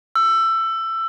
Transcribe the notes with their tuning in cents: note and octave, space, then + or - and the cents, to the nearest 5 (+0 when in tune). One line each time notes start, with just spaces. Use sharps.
E6 +20